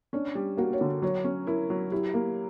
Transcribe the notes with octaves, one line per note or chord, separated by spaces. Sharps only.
C#4 D4
G3
A#3 F#4
C#5
D3
F#3 C#5
C#4
E4 A#4
F#3
E4 G4
A#3